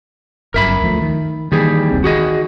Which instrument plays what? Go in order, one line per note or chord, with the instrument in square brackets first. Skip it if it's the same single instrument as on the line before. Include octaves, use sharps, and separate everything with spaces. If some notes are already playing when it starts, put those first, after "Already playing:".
[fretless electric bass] G1 F#2 [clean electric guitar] A#4 E5 B5
[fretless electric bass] D2 F3 A3
D#3
[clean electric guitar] D#2 G3 G#4 [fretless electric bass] D#3 E3
[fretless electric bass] E1 C2 C4
[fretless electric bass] D#3 [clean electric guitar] F#4 G#4 D#5